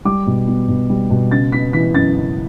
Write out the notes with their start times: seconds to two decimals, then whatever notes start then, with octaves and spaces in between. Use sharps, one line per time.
0.05 G3 D6
0.27 B2
0.47 B3
0.68 B2
0.90 G3
1.10 B2
1.31 C#3 A6
1.52 B3 B6
1.73 E3 B6
1.95 F#2 A6
2.16 C#3